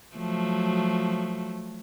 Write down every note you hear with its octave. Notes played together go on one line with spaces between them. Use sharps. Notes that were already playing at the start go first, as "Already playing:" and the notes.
F3 F#3 A3